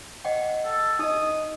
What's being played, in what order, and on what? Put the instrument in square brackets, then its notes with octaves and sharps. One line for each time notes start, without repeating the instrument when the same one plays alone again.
[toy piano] D#5 F#5 G5
[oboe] A4
[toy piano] D#4 D#5 [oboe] D#6